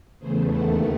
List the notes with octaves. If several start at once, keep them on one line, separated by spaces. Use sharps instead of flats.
E2 C#3 E3 A3 G#4 C5
D#2 D#3 A3 F#5 A5